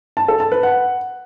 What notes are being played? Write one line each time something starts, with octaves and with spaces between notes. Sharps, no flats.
A5
A4
A5
B4
F#5